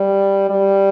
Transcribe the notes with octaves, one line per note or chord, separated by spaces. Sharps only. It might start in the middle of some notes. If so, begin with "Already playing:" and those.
Already playing: G3
G3